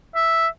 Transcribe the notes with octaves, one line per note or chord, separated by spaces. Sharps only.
E5